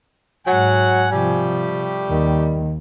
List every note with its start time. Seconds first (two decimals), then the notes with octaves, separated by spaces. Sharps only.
0.47 G#2 F#3 F#5 G#5
1.12 C3 F3 G3 A3 G4
2.10 D#2 D#3